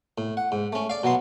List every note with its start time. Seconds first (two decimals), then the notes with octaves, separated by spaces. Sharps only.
0.18 A2
0.37 F#5
0.52 G#2
0.73 A3 C#4
0.90 D5 F5
1.03 B2 F#3 B3 C6